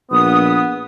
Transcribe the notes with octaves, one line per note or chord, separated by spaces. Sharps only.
A#1 B3 D#6